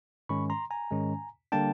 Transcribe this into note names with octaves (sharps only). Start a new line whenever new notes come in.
G#2 D#3 G#3 C#4 B5 C#6
A#5 C6
G#5 A#5
G#2 D#3 G#3 C#4
D3 G3 A#3 D4 G5 A5